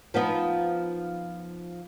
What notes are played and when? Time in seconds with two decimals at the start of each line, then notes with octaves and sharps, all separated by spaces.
0.14 F3 B3 D#4